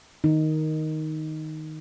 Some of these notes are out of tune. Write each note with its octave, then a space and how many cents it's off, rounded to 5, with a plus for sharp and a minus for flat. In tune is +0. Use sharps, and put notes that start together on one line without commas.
D#3 +0 D#4 +5